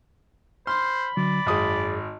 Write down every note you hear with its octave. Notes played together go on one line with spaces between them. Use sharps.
C5 B5 C6 F6
D3 F#3 D5
G#1 F#2 G#4 D#6